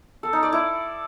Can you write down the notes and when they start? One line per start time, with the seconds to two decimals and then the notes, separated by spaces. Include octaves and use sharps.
0.23 A4
0.33 D#4
0.43 D5
0.53 E4